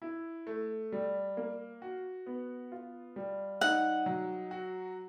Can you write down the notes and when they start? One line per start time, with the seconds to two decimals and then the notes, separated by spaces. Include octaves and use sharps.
0.02 E4
0.47 A3
0.92 G3
1.37 A#3
1.82 F#4
2.26 B3
2.72 F4
3.16 G3
3.61 D#4 F#5
4.06 F#3
4.51 F#4